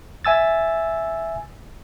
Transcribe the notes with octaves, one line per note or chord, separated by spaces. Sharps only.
E5 G#5 E6 A6